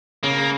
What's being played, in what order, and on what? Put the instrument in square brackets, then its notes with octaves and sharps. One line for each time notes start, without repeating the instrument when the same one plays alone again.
[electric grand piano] C#3 [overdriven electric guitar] A#3